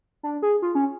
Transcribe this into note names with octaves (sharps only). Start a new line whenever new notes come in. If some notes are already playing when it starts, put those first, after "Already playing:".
D4
G#4
F4
C#4